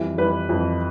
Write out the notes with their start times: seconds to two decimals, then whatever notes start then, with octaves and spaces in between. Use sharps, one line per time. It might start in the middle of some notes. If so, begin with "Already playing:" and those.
Already playing: F2 E3 G3
0.18 F2 E3 G3 B4
0.49 F2 E3 G3